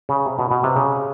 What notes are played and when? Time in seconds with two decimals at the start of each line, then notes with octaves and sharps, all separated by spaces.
0.09 C#3
0.26 C3
0.39 B2
0.51 B2
0.63 C3
0.76 C#3